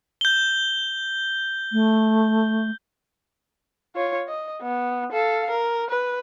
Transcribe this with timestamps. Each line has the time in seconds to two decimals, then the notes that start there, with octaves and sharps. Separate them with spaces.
0.21 G6 G7
1.73 A3
3.95 F4 C#5
4.28 D#5
4.61 B3
5.12 A4 F5
5.50 A#4
5.90 B4